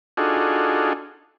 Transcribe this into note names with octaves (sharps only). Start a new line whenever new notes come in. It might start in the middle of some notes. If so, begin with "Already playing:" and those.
D4 D#4 F4 F#4 G#4 A4